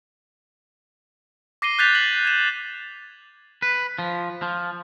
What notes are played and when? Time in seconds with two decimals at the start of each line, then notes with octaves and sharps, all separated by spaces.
1.62 D6 A#6 C7 D#7 G7
1.79 F#6 G6 A6 B6 F7
1.95 B6 F#7
2.25 G#6 E7
3.62 B4
3.99 F3
4.42 F3